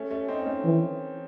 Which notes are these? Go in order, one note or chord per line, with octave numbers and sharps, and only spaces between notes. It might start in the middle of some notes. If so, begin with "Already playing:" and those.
Already playing: A3 C#4
A3 C#4
C4 D#4
D#4
A3 C#4
E3